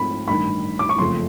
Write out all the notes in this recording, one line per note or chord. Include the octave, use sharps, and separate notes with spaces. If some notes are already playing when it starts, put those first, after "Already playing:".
Already playing: G#2 F3 A3 C4 B5
A1 G2 D#3 B5
D6
C#6
F#1 F2 C#3 F3 A3 C6